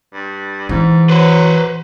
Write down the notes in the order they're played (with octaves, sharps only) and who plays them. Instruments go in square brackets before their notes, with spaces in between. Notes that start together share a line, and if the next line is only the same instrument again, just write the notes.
[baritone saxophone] G2
[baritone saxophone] G#2 [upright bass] E3
[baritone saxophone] F#3 [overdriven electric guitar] B4 C5